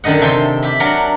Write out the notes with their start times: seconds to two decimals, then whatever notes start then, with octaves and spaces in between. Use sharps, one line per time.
0.04 F#2 D3 D#3 D#5 F#5
0.22 C3 A4 G5 G#5 C6
0.63 G4 E5 B5
0.80 F#3 D4 A#4 F#5